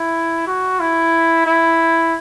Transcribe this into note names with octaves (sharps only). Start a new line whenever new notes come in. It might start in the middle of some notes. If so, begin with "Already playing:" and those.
Already playing: E4
F#4
E4
E4